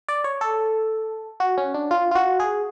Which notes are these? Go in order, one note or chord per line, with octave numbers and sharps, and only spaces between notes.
D5
C#5
A4
F#4
C#4
D4
F4
F4
F#4
G#4